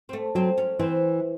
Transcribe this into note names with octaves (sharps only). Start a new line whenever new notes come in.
C4
A3
F#3 C4
C#4
E3 C4